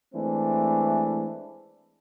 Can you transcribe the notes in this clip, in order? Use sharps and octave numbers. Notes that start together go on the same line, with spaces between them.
E3 G#3 A3 C4 D4